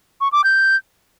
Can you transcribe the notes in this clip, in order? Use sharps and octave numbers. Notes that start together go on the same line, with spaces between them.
C#6
D6
G6